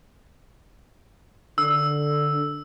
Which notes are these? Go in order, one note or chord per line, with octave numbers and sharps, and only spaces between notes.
D3 E6